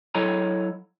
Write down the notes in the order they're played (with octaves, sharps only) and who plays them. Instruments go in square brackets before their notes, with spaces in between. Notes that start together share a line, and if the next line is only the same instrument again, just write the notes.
[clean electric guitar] F#3 E4 A4 C#5 D#5 A#5